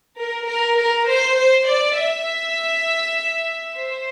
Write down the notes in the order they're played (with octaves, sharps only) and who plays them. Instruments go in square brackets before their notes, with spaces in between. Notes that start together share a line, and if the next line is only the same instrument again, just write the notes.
[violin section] A#4
A#4
A#4
C5
C5
D5
E5
C5